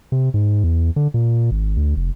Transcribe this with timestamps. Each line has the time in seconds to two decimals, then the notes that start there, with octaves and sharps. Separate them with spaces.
0.12 C3
0.34 G#2
0.64 E2
0.96 D3
1.14 A#2
1.51 G#1
1.76 D2
1.96 F1